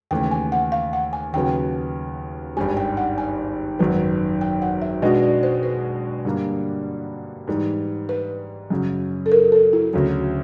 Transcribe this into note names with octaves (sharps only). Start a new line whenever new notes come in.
D#2 C#3 E3 A3 G5
G#5
F#5
F5
F#5
G#5
D#2 C#3 F#3 B3 G5
G#1 G2 D#3 G3 G#5
G5
F#5
G#5
G#1 F#2 D#3 F#3 B3
G5
F#5
E5
B2 G#3 B3 D4 F#4 D#5
D5
C5
B4
G2 D3 G3 A#3
G#2 E3 G3
B4
F#2 C#3 F#3
A4
A#4
A4
E4
D2 C#3 F#3